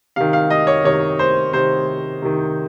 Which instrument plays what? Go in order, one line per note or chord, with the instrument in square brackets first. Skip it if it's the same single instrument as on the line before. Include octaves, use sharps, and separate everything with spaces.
[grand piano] C3 D#3 F5
F5
D#5
C#5
C3 D#3 C#5
C5
C3 D#3 C5
C3 D#3